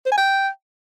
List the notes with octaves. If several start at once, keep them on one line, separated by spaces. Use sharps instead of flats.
C5
G#5
G5